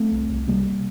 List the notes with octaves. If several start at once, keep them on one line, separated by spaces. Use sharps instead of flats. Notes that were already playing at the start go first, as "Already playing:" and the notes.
Already playing: A3 C4
C2
C2
C3 G3 A#3